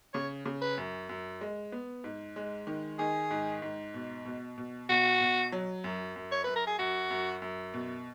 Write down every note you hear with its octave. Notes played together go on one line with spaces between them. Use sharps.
C#3 C#5
C#3
B4
F#2
F#2
G#3
B3
G#2
G#3
D#3
D#3 G#4
G#2
G#2
B2
B2
B2
B2 F#4
B2
F#3
F#2
F#2
C#5
F#2 B4
A#4
G#4
F#2 F#4
F#2
F#2
B2